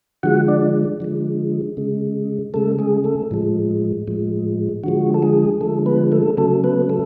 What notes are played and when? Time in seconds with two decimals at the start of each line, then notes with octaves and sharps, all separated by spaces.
0.23 D3 F3 G#3 F#4 F#5
0.48 D4 D5
1.00 D3 F3 G#3
1.77 C#3 G#3
2.54 C#3 G#3 A3 A4
2.79 G#3 G#4
3.04 A3 A4
3.31 A2 F3 G#3
4.07 A2 F3 G#3
4.84 D3 F3 G#3 F#4
5.14 A4
5.22 G#3 G#4
5.61 D3 F3 G#3 A3 A4
5.86 B3 B4
6.12 A3 A4
6.37 C#3 F#3 A3 A4
6.64 B3 B4
6.89 A3 A4